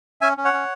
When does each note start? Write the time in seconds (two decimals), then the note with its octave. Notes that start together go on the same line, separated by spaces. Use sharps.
0.21 C#4 E5 G#5
0.37 C#4
0.45 C#5 F#5
0.53 C#4